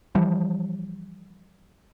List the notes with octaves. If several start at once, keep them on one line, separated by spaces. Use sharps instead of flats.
E3 F3 G3